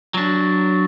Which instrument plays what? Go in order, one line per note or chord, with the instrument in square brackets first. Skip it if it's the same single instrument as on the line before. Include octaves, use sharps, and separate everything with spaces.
[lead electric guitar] F#3 D4